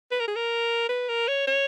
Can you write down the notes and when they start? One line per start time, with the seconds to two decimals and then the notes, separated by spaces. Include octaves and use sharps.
0.11 B4
0.20 A#4
0.28 G#4
0.36 A#4
0.89 B4
1.09 A#4
1.28 C#5
1.47 C#5